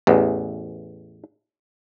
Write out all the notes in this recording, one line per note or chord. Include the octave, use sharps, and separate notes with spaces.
A1 E2